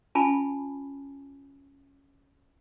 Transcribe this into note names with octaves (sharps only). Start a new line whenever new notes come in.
C#4 F4 G#5 A5 B5